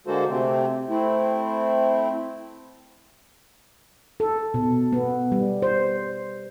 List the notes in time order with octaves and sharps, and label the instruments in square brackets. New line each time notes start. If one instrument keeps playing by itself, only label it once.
[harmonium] D3 G#3 A#3 F#4 A4 C5
C3 A3 C4
A3 C4 E4
[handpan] A4
B2
B3
G3
C5